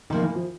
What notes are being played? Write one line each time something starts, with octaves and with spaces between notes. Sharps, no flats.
C3 D#3 F3 A#3
E3
F3